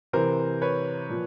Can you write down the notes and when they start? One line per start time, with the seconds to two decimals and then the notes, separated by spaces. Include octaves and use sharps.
0.13 C3 E3 A#4 C5
0.62 B4 C#5
1.09 A#2 F3